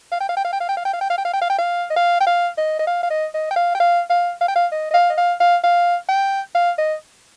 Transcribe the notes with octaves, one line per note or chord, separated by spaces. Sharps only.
F5
G5
F5
G5
F5
G5
F5
G5
F5
G5
F5
G5
F5
G5
F5
G5
F5
G5
F5
D#5
F5
G5
F5
D#5
D#5
F5
F5
D#5
D#5
G5
F5
G5
F5
F5
F5
G5
F5
D#5
D#5
F5
D#5
F5
F5
F5
G5
F5
D#5